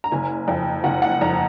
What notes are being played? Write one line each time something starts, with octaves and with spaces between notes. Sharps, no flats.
A#5
F#1 G#5
F2
F#1 F#5
F#5
F2 A#5